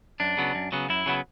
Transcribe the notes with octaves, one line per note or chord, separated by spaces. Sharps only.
F#2 D4
C#3 F#3 B3
F#2
C#3 F#3 B3
F#2 E4
C#3 F#3 B3